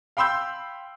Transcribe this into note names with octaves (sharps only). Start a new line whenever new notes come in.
F5 G5 B5 C6 E6 G6